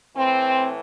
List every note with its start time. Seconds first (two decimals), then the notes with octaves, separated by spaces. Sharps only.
0.16 A2 E3 C4